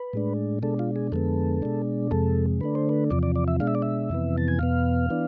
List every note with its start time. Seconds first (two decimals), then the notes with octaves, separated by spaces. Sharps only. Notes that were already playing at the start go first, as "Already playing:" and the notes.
Already playing: B4
0.13 A2 G#3 D4
0.62 B2 G#3 D4 A4
0.79 F4
0.96 G#4
1.12 F2 D3 G#3 B3 A4
1.62 B2 G#3 D4
2.11 F2 C3 G#3 A4
2.61 D3 A3 D4 B4
2.75 C5
2.89 B4
3.10 E2 C3 F3 D5
3.23 D5
3.36 D5
3.48 E5
3.60 B2 G#3 D4 F5
3.67 E5
3.75 D5
3.82 E5
4.10 F2 C3 E3 B3
4.38 A5
4.48 G#5
4.59 E2 B2 B3 F5
5.10 E3 B3 D4